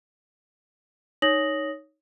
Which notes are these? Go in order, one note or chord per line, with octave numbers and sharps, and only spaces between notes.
D#4 C#5 D#6 A#6 F#7